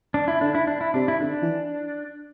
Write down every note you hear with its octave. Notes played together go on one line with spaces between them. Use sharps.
D4
E4
D3 D4
E4
D4
E4
C3 D4
E4
D3 D4
E3